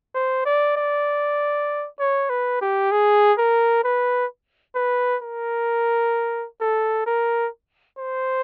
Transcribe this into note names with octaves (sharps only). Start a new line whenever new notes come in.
C5
D5
D5
C#5
B4
G4
G#4
A#4
B4
B4
A#4
A4
A#4
C5